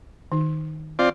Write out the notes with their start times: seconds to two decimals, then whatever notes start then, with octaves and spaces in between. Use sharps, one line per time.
0.32 D#3 D#4
0.99 C4 F4 D5